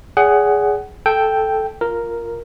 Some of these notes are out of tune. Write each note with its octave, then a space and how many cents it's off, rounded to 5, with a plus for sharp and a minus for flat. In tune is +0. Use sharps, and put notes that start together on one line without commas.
G#4 +0 D5 -40 F#5 +20
A4 -5 G5 +0
F4 +0 A#4 +0